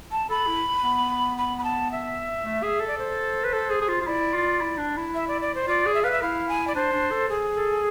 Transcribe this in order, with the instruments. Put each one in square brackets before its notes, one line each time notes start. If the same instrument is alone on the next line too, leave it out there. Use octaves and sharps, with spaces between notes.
[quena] A5
[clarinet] A4 [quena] B5
[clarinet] E4
B3
[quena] B5
B5
A5
E5
[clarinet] A3
G#4
A4
[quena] D5
C5
[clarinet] B4
A4
G#4
G#4
F4
F4
[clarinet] E4 [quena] D5
[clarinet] F4
E4
D4
E4
[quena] E5
D5
D5
C5
[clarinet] F4 [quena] D5
[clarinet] G#4
[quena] E5
[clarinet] B4 [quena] F5
[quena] E5
[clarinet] E4 [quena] F5
[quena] G#5
D5
[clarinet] D4 [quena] C5
[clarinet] D4
A4
[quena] G#4
[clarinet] A4